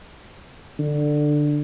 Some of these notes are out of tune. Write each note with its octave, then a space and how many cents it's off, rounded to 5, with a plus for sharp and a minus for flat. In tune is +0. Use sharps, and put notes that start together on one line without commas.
D3 +10